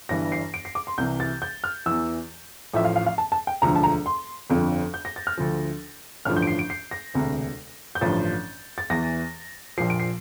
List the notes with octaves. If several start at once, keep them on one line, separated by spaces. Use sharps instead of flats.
G1 G2 E3 A#6
C7
D7
C7
D6
C6
C2 C3 E3 G6
A6
G6
F6
E2 E3 E6
A1 A2 F3 E5
F5
F5
F5
A5
A5
G5
E1 D2 D3 F3 A#5
A5
A#5
C6
G1 F2 D3 F3
G6
A#6
A6
F6
D2 D3 F3
A1 G2 D3 F3 F6
G6
D7
C7
D7
C7
A#6
E1 D2 C3
G6
A1 G2 D3 F3 A6
A6
E2 E3 A#6
A#1 A#2 F3 C7
D7
C7